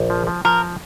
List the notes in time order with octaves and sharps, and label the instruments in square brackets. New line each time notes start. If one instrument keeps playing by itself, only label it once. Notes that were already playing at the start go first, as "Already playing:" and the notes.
Already playing: [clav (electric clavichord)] A#1
F3
F3
[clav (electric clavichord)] F3 [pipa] A#4